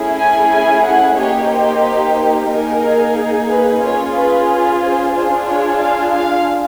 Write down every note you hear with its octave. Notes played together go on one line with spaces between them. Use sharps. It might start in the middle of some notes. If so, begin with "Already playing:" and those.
Already playing: A3 C#4 E4 G#4
G#5
G#5
F#5
A#3 D#4 G4 C#5
C5
A#3 D#4 G#4 A#4
B4
C#4 F4 G#4 C#5
B4
B4
C5
D4 F4 G#4 C5
C#5
F5
F5